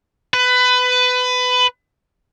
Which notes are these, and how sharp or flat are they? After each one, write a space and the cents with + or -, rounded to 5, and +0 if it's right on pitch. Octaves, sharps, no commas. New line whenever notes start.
B4 +20